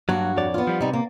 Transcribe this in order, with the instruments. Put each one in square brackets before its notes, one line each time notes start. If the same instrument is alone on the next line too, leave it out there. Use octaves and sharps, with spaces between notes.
[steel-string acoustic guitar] G2 A#3 F#4 [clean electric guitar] F#3
[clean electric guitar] F2 C#5 D5
[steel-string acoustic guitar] B3 F4
[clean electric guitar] F3 G3
[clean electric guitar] C3 [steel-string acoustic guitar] G3 D#4
[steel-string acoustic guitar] A#3